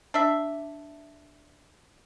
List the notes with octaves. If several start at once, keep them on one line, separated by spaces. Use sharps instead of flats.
D4 E5